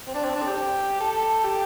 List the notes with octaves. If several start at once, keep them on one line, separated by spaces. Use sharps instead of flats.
C4
D4
C4
D4
A4
G4
A4
G4